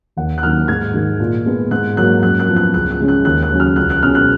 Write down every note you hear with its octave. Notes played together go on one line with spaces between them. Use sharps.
D#2 F#5
F#6
D#3 F#3 A#3 F6
G#2 G#6
D#3 G#3
A#2
G#3 B3
G#2 F#6
F#3 A#3 F#6
F#2 F#6
F#6
F3 B3
F#6
C#2 F#6
F#6
C#3 G#3 C#4
F#6
D#2 F#6
F#6
C#3 F#3 C#4
F6
C#2 F#6
F#6
B2 G#3 C#4 F6
F#6